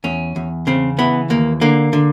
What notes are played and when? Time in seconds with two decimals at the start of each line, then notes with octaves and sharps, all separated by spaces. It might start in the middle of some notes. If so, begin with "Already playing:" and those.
0.04 E2 C#4
0.36 E2
0.67 C#3 C4
0.99 E3 B3
1.30 D#2 A#3
1.61 D3 A#3
1.93 D3